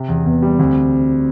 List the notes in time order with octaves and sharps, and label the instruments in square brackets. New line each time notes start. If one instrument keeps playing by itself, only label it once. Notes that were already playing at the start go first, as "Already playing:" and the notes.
Already playing: [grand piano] C3
E2
[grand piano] E2 [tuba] B3
[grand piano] G3
[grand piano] D2 [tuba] C4